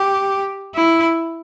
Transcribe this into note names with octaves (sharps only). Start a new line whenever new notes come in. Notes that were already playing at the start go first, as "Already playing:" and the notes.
Already playing: G4
E4